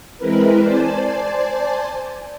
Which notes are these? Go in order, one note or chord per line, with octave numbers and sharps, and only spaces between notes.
E3 G#3 C4 E4 A#4 B4
C5 D5 G#5 A5